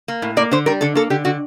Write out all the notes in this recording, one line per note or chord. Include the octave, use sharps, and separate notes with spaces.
A#3
A2
A#3 D5
D3 C5
G3 A#4
D3 A4
A#3 A4
D3 G4
D3 F#4